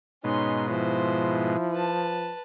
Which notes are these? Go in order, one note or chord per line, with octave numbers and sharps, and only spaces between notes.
G#2 B2 C#4 D#4 C6
F3 E4 C5
B4 A5